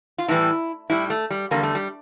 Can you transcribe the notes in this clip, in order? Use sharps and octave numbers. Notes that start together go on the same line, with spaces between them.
F4
A2 E3 G3 E4
A2 G3 E4
A3
G3
E2 D3 G3 A#3
A3
G3